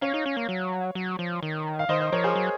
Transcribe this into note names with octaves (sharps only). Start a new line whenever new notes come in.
C#4 C#5 F5
D#4
C#4
A#3
F#3
F#3
F3
D#3
F5
D#3 C5 D#5
C5 D#5
F3 A#4 C#5
G#4 C5
F#3